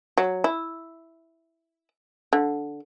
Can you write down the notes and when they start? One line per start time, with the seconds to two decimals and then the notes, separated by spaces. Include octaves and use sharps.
0.18 F#3
0.44 E4
2.33 D3